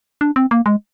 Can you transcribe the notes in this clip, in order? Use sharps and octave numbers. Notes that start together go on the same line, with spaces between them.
D4
C4
A#3
G#3